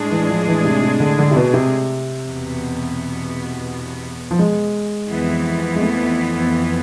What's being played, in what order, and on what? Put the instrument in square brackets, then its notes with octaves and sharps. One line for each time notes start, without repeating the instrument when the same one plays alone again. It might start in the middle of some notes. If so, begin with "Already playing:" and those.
Already playing: [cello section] A2 G#3 D4 G#4
[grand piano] E3
F3
E3
C3
C3
D3
D3
C3
B2
C3
[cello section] E2 B2 B3
[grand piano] F3
G#3
[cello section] F2 E3 B3
[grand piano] G#3
A3